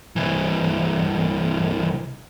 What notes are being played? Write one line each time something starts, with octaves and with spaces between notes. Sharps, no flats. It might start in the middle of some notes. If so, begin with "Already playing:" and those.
C2 E3